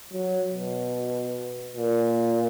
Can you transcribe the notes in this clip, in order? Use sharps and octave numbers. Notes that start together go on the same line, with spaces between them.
F#3
B2
A#2